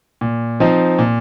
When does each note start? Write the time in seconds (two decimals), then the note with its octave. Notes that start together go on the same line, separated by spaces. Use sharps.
0.21 A#2
0.60 F3 C4 D#4
0.99 A#2